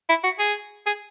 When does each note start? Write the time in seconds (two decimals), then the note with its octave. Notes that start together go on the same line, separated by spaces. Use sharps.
0.09 E4
0.24 F#4
0.39 G#4
0.86 G#4